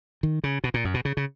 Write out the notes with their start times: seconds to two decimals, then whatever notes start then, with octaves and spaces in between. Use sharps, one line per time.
0.23 D#3
0.44 C#3
0.64 B2
0.74 A#2
0.85 F#2
0.94 B2
1.05 C#3
1.17 C#3